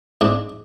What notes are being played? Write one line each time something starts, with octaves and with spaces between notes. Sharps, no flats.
G#2 D4